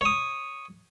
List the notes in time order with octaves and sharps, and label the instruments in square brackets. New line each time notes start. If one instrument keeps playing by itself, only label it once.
[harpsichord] C#5 D#6